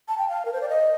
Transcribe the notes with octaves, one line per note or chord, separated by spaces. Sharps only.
A5
G5
F5
A#4
C5
D5
D#5